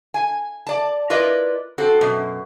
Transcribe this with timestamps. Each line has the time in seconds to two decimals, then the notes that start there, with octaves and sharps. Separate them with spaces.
0.14 G#5
0.67 D5 A5
1.10 E4 F4 A#4 B4 D5 D#5
1.78 C4 F#4 A4
2.01 F#2 B2